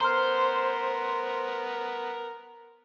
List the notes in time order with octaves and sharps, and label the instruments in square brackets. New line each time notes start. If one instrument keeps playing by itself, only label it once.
[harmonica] B3 A#4 [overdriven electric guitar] C5 [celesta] A#5 C6 F6